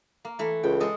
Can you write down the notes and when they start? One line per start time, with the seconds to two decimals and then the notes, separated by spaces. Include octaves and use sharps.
0.25 A#3
0.39 E3 A3
0.63 C#2 G5
0.80 G#3 A4 D#5